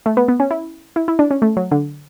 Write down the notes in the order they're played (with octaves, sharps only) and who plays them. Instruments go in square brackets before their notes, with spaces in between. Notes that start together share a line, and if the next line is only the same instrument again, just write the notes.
[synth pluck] A3
B3
B3
C#4
E4
E4
E4
D4
C#4
A3
F#3
D3